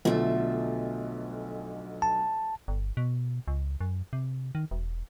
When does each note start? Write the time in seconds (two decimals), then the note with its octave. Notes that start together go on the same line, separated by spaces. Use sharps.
0.05 B1 B2 D3 F3 A3
2.02 A5
2.68 G1
2.97 B2
3.48 C#2
3.81 F#2
4.13 C3
4.55 D#3
4.71 E1